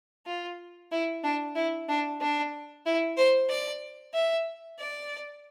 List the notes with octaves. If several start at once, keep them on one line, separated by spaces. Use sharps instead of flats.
F4
E4
D4
E4
D4
D4
E4
C5
D5
E5
D5